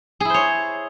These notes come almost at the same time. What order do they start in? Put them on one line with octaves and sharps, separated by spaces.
G#4 E4 C5 C#5